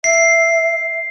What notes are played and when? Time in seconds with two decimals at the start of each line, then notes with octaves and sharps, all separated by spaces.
0.04 E5 C7